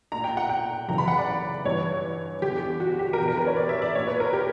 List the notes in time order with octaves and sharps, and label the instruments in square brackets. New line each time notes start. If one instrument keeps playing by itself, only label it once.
[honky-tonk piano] A#2 A#5
G5
F#5
G5
F#2 C#3 E3 A#5
B5
F#5
D5
G2 E3 C#5
E2 D3 G4
F#4
G4
A#4
E2 D3 G4
A#4
B4
C#5
D5
E5
D5
A#2 C#5
B4
A#4
G4